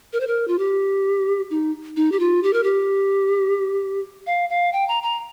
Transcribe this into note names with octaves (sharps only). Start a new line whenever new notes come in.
A#4
C5
A#4
F4
G4
D#4
D#4
G4
F4
G4
A#4
G4
F5
F5
G5
A#5
A#5